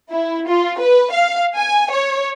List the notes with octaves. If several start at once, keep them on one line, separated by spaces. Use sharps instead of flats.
E4
F4
B4
F5
G#5
C#5